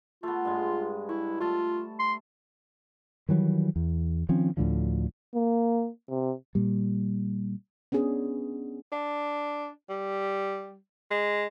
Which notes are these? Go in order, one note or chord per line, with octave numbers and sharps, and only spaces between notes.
A3 B3 F4
G2 G#3
E4 C#6
A3 F4 A5
C6
D#3 E3 F#3 G3
E2
D#3 F3 C4 C#4
D2 A2 D3 F3
A#3
C3
A#2 G3
B3 C#4 D4 G#4
D4
G3
G#3